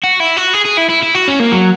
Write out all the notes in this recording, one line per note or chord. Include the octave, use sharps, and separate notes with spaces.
F#4
E4
F#4
G#4
G#4
E4
E4
E4
F#4
C#4
A#3
F#3